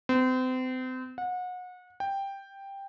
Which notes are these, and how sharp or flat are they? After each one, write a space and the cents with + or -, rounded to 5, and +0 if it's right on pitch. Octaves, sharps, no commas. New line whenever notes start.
C4 -35
F#5 -30
G5 +5